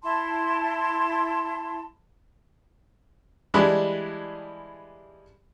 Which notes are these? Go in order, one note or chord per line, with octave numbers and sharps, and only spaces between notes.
E4 A5 C6
E3 G3 G#3 D4 E4 B5